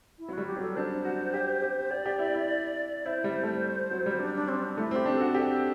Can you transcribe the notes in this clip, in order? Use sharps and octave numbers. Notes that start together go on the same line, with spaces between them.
E4
F#3
G3 F#4
G4
F#3
A4
D4 C5
F#4
G4
G4
G4 D5
G4
E4
E4
E4 C5
G3
A3
F#3
G3
D4
D4
C4
D4
A3 E4
C4 G4
D4
A4
F#4
G4 A4